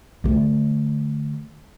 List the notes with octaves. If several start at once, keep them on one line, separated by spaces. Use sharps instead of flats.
D3 A3